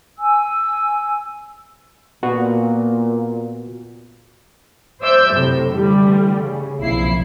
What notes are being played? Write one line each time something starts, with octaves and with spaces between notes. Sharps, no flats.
G#5 E6
A#2 B3 F#4
C5 D5 E5 E6 G6
F#2 A2 C3
D3 E3 G3 A3
C#3
B1 F2 A#2 E4 C7